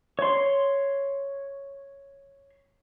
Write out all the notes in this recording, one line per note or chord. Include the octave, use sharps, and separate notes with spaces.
C#5 C6